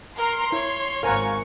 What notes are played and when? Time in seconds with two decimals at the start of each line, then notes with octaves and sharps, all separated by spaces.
0.16 A#4 A#5 C6
0.52 E4 C#5
1.03 G#1 A#4 C5 F5 F#5 G#5 A#5 C#6